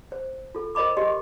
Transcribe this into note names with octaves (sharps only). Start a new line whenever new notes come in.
C5
F4 A4
A#4 C5 D#5 B5 D6
G4 D#5 C6